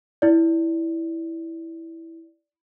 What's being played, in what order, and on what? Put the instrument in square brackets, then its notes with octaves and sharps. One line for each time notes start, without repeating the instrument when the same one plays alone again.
[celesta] E4 D5